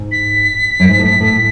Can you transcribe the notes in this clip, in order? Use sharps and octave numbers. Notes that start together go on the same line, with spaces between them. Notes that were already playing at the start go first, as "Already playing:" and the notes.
Already playing: G#2
B6
F#2
G#2
A2
A2